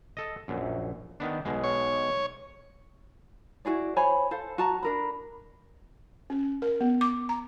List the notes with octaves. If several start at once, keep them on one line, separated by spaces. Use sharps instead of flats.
A4 D#5
A#1 F#2
D#3 B3 D4
B1 B2 G#3
C#5
E4 F#4 G#4 D5
C5 C#5 G#5 B5
A4 C5 F5
F#4 A5 A#5
D4 A#4 B5
C#4
A#4
B3
D6
A#5